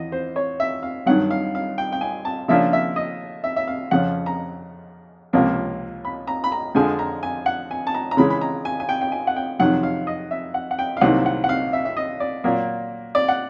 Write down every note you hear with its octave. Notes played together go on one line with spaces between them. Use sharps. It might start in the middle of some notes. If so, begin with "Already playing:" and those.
Already playing: E2 D#5
C5
C#5
E5
F5
G2 D#3 F#3 F#5
F5
F5
G5
G5
G#5
A5
C#3 F3 A#3 D4 E5
E5
D#5
E5
E5
F5
F2 C#3 F3 F#5
A#5
C#2 C3 F3 A#3 C#4
B5
A#5
B5
A#5
F2 D3 F3 G#3 G#5
A#5
G#5
F#5
G#5
A5
A#5
A#5
C#3 E3 G#3 B5
B5
A#5
G#5
G#5
G5
G5
G#5
F#5
G5
F2 C3 D#3 F#3 F#5
F5
D#5
E5
F#5
F#5
G5
F5
C2 C3 D#3 F#3 A#3 F#5
F#5
F#5
F5
E5
E5
D#5
D5
A#2 F#3 A#3
D5
F#5